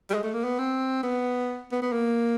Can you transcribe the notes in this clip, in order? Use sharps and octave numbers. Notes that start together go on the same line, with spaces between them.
G3
G#3
A3
A#3
B3
C4
B3
B3
B3
A#3